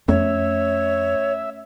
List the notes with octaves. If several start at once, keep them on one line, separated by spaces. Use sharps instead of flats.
F2 A3 C#4 C#5 E5